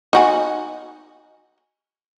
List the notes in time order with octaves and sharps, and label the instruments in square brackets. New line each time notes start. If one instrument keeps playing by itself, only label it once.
[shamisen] D#4 F#4 G#5